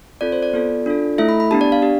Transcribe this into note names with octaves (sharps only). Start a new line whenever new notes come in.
C4 F4 A4 D5
C5
D5
B3 F4 A4
D4 F4 A4
A3 E4 A4 E5
B5
B5
B3 D4 G4 A5
D5
F5
D4 G4